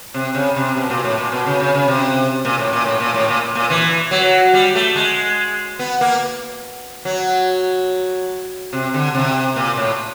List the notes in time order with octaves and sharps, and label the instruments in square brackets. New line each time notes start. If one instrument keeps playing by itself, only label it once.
[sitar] C3
C#3
C3
B2
A#2
A2
A#2
B2
C#3
C#3
C#3
C3
A#2
A2
A#2
A2
A#2
A2
A#2
A#2
E3
F#3
G3
A3
G#3
B3
A#3
F#3
C3
D3
C3
A#2
A2